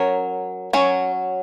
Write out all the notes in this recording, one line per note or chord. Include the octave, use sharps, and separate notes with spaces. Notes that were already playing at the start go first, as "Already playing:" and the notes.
Already playing: F#3 C#4 A#4 C#5
F#3 C#4